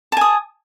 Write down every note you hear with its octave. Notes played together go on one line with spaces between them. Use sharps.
G#5 A5 D#6